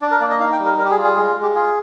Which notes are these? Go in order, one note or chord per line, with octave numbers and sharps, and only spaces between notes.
D4 D5
A#4
A#3 D5
D#5
D#4 F5
G5
G3
A#4
G3 A#4
G4
G#4
F4
G#4
G#3 G#4
G#3
G4
F4 G#4